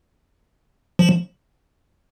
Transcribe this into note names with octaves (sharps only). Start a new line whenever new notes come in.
F3